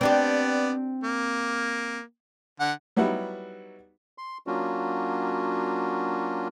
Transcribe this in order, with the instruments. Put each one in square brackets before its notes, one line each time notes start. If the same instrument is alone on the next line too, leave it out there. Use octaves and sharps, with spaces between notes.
[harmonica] B3 D5 [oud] C4 D4 G4
[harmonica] A#3
D3 F#5
[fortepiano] F#3 G3 B3 D#4 E4 F#4
[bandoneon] C6
F#3 A#3 C#4 D4 F4 F#4